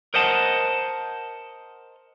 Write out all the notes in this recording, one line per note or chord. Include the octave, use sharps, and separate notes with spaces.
A#4 C5 D#5 F#5 A5